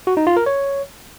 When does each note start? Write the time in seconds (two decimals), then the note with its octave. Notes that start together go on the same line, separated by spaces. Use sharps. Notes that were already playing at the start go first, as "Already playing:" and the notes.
0.07 F#4
0.17 D#4
0.27 F4
0.37 A#4
0.46 C#5